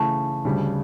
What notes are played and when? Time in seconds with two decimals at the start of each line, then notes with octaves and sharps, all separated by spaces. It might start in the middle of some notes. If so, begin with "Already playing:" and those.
Already playing: C#3 E3 A3 A5 C#6
0.45 D2 C#3 G3